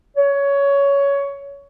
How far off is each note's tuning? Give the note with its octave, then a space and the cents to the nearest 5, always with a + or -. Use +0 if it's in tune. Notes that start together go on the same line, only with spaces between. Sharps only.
C#5 +15